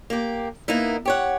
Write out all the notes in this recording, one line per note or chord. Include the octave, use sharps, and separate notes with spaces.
A#3 G4
A#3 B3 D#4 E4
G4 C#5 F#5